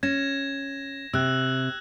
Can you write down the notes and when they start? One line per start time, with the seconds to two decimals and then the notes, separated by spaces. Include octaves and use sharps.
0.03 C#4 G#6 A#6 E7
1.13 C3 E6 F#6